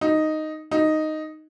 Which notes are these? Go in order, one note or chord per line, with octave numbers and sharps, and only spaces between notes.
D#4
D#4